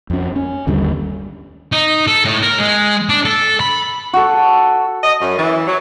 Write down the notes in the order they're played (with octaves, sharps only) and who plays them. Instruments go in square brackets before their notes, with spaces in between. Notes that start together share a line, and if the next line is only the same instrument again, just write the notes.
[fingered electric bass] F2 C#4
C#4
G1 D#2 D3 G3
[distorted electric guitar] D#4
A4
A2
A#4
G#3
D4
A4
B5
[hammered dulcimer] F#4 A4
[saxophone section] D#5
F#2
E3
F#3